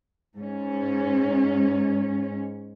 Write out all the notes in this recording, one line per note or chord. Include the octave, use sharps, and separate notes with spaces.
G#2 C#4